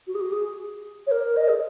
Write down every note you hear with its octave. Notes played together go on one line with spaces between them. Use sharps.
F#4
G#4
F#4
G#4
C#5
A#4
D#5
G#4